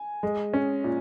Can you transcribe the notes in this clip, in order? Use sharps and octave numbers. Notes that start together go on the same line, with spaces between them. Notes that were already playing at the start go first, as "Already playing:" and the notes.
Already playing: G#5
G#3
C#4
A#2